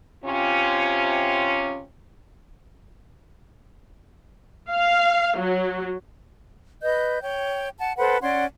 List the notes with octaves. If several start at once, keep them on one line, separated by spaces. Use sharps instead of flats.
C3 C#4 F4
F5
F#3
B4 D#5 G6
C#5 G5
F#5 A5
A4 B4 C5 F#5
C#4 D5 F#5 C6